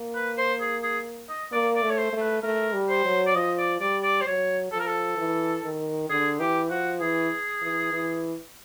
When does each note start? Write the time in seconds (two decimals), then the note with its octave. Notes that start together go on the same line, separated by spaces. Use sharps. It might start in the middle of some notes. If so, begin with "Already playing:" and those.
Already playing: A#3
0.15 B4
0.38 C5
0.60 G#4
0.83 G#4
1.29 D#5
1.52 A#3 D5
1.75 D5
1.82 A3
1.90 C#5
1.97 C5
2.13 A3
2.21 B4
2.43 A3 A#4
2.74 G3
2.89 C5
3.05 F#3
3.26 D5
3.35 F3 D#5
3.58 D5
3.81 G3 D5
4.03 D5
4.21 C5
4.26 F#3 C#5
4.72 F3 A4
4.79 A#4
4.86 A4
5.17 E3
5.64 D#3
6.09 D3 G#4
6.40 E3 G4
6.70 F3 F#4
7.01 E3 G#4
7.62 E3
7.93 E3